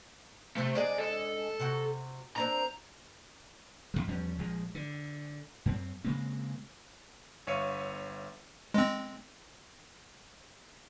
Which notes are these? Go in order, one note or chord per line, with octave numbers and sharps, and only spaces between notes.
C3 A3 C4
G#3 D4 G#4 D5
A4
C3 F#4
C4 D4 A#4 A#5
A1 D#3 F3
E2 F3 G3 C#4
A#1 F3 G#3
D3
F#2 C4
C#3 G#3 A#3 C4
G1 C#5 E5 F5 C#7 D#7
G#3 C4